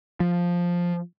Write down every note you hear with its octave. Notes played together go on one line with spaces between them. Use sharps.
F3